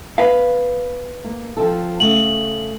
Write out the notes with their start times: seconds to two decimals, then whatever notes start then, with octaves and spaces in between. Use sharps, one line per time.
0.18 B3 B4 F5
1.24 A#3
1.57 F3 C4 A4
2.00 C#3 A3 F#5 F#7